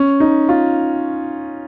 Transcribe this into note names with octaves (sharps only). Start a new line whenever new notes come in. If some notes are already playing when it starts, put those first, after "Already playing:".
Already playing: C#4
D#4
F4